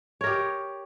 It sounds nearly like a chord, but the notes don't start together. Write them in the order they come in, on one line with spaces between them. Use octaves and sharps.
C#5 A#4 G4